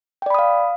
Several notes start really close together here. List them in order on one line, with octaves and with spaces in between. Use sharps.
G5 D5 B5 D#6 F5